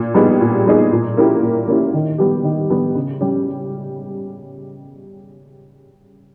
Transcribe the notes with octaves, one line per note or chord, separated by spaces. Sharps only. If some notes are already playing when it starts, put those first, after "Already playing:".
Already playing: A#2
G3 B3 D#4 G#4
A#2
G3 B3 D#4 G#4
A#2
A#3 C#4 E4 G4
A#2
A#3 C#4 E4 G4
D#3
G3 B3 G4
D#3
G3 B3 G4
C#3
G3 C#4 G4